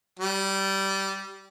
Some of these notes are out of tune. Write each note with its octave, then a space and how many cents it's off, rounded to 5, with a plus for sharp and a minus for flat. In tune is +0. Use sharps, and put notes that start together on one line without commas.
G3 -15